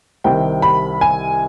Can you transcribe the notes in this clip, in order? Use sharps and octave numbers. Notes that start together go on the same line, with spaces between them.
C2 C3 D#3 G5
B5
G#5